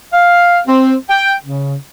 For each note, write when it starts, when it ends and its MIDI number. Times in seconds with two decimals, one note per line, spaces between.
0.13 0.59 77
0.67 0.94 60
1.09 1.35 79
1.44 1.75 49